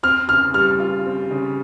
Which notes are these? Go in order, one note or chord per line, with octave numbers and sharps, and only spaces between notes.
C4 F6
C#3 F6
G3 F6
F4
C4
C#3